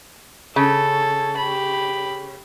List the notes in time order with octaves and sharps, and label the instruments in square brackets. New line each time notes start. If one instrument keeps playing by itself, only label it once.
[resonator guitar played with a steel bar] C#3 [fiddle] A4
[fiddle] G4 B5